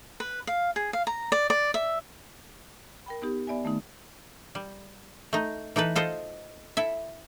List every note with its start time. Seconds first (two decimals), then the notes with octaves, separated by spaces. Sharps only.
0.20 B4
0.47 F5
0.76 G#4
0.93 F5
1.07 A#5
1.32 D5
1.50 D5
1.74 E5
3.06 A#4 G5 B5
3.22 B3 D#4 G4
3.47 B3 D5 E5 G#5
3.64 D#3 A3 B3 D#4
4.55 G3
5.33 A3 D#4
5.76 E3 D#4 A4 B4
5.96 F4 A4 C5 D#5
6.77 E4 A4 E5